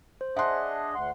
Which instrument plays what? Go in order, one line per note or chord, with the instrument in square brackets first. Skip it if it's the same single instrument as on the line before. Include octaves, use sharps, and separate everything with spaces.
[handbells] C5
[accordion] D4 G#4 D#5 [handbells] E5 F#6 [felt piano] F#5 C6
[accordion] D2 F#5 C6